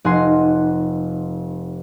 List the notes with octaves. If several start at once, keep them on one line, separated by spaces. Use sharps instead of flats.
F1 D#4 F#5 G#5 C6 C7